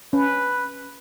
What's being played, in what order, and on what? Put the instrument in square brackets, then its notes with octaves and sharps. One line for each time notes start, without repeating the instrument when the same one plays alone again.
[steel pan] C#4 [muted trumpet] B4